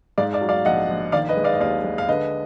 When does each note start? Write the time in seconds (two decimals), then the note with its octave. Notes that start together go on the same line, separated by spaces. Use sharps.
0.18 G#2 D5 F5
0.33 D5 F5
0.41 F#3
0.49 D5 F5
0.65 A#1 D#5 F#5
0.89 A#1
1.12 D#3 D5 F5
1.28 B4 D#5
1.37 G#3
1.44 D5 F5
1.53 D#5
1.60 D#2 D5 F5
1.84 G#3
1.98 F5
2.08 D3 B4 D#5